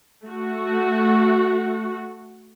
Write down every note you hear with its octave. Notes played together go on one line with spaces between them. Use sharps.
A3 F#4